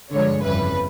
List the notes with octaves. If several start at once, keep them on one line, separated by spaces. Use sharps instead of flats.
G2 D3 F3 G#3 C#5
G1 F2 C#3 E3 G3 B4